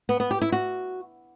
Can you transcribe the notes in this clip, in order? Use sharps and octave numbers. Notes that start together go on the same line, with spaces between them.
B3
B3
G4
E4
F#4